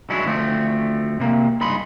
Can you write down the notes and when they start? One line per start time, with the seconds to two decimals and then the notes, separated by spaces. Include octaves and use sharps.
0.10 F#3 G#3 C#4 D4 E4
0.25 D2 F3 G#3 A3 C4
1.20 C3 A#3
1.61 C#2 G2 D#4 G#4 B5 C6